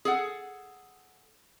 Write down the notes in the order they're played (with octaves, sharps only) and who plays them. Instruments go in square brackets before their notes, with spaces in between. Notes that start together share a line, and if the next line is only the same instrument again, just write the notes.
[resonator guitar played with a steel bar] G#4 A4 F#5